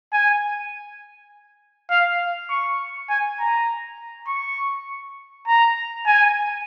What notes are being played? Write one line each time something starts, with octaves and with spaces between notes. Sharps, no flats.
G#5
F5
C#6
G#5
A#5
C#6
A#5
G#5